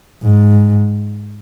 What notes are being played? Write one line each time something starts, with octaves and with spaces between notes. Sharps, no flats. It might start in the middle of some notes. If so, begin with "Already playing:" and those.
G#2